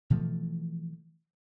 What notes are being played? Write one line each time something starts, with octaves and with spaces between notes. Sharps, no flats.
B2 E3 F3 A3